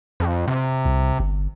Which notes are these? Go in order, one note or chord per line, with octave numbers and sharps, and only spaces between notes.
F2
C3
C2
G1